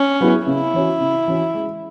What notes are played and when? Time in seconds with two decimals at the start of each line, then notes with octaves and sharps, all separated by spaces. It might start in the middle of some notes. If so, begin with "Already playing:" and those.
Already playing: C#4
0.20 F#3 B3 E4 G#4
0.46 C#3 E4
0.73 E3 C#4 F#4
1.00 C#3
1.28 E3 C#4 F#4
1.54 G#3